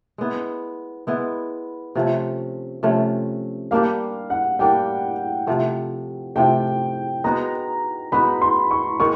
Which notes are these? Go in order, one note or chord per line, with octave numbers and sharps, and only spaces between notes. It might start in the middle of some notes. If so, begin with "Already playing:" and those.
G#3 B3 E4
G#3 B3 E4
C3 F3 A3 C#4
C3 F3 A3 C#4
G3 A#3 D4 G4 F5
F#5
G3 A#3 D4 G4 G5
C3 F3 A3
C3 F3 A3 G5
G#3 B3 D#4 F#4 A#5
G#3 B3 D#4 F#4 B5
C6
C#6
D#3 G#3 C#6